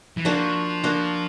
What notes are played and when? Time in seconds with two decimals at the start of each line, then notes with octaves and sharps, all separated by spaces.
0.17 E3
0.25 F3 A#3 D4 F#4
0.84 A#3 D4 F#4